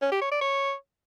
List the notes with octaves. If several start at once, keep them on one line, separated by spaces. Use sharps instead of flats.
C#4
G4
C#5
D5
C#5